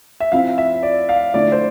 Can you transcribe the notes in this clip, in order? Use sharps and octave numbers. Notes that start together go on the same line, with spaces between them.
E5
F3 C4 E4 F5
E5
D5
F5
D3 F3 A3 E4 D5
C5